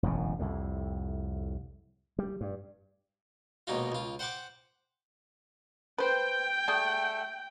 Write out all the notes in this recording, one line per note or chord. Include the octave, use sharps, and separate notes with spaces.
E1 A1 F#2 C#3
C2 F2 A2
G3
G2
A#1 D#2 B2 G#3 D#4 F4
C#2 F4
C5 F#5 G5 C6 D6
B4 C5 G5
G3 A3 G#4